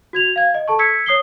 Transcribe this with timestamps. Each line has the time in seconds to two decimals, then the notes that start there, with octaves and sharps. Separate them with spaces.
0.13 F#4 G#6 F7
0.36 F5 G#6
0.54 D#5
0.68 A4 A5 C#6
0.79 E6 G#6 B6 C#7
1.06 C#5 D#6 C7 G7